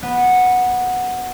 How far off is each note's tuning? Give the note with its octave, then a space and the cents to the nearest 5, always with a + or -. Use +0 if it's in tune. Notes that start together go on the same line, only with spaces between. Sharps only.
B3 -10